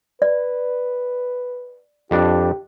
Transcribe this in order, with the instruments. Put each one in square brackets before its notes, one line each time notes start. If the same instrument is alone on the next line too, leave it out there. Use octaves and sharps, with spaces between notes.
[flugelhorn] B4 [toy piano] D5
[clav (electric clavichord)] F2 D4 [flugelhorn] G4